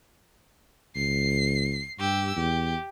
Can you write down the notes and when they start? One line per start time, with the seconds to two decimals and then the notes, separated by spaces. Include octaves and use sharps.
0.96 C#2 C7
1.99 G2 G4 E6
2.36 E2 G4